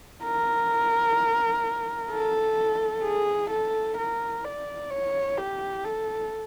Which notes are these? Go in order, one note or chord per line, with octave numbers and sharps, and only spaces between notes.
A#4
A4
G#4
A4
A#4
D5
C#5
G4
A4